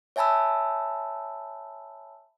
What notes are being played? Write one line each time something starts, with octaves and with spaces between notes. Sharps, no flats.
C#5 E5 G#5 A5 B5 E6